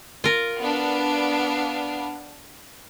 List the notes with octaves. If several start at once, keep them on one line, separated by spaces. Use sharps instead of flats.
F4 A#4
B3 D4 F5